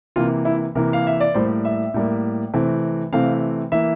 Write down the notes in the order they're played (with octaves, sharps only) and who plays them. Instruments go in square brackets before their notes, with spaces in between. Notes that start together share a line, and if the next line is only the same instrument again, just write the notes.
[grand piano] C3 E3 A#3 F4
E4
C3 E3 A#3 A#4
F5
E5
D5
A2 G3 A#3 C5
E5
A2 G3 A#3
C3 E3 A3 C4
C3 E3 A3 C4 F5
E3 A#3 E5